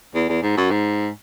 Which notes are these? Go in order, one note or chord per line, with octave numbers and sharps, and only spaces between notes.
E2
E2
G#2
F#2
G#2